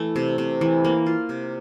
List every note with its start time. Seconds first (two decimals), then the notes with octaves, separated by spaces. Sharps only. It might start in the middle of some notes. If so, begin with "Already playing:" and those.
Already playing: E3 A3
0.16 C3
0.38 C3
0.61 E3
0.85 A#3
1.06 F4
1.29 C3